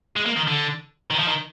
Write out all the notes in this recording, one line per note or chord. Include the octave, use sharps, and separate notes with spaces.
G#3
A#3
D#3
D3
D#3
F3
D#3